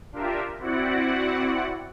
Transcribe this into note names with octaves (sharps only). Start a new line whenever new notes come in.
D4 F4 G4 A#4 E5
C4 E4 F#4 D5 F#5